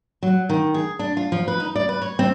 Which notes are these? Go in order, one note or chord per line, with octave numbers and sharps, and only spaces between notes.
F#3
D#3
G#4
D4
F4
F3
B4
D#4
D5
B4
C#5
C4